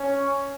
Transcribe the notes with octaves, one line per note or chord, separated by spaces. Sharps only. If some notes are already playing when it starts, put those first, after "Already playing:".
Already playing: C#4 C#5